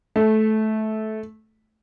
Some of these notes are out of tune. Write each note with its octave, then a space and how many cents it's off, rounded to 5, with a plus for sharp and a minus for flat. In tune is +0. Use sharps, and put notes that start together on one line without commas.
A3 -15